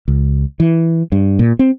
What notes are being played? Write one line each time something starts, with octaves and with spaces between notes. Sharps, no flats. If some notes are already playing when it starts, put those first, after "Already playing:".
C#2
E3
G2
A#2
C4